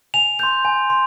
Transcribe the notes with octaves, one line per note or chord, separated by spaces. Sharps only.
G#5 F7
C6 G6 F7
G#5
C6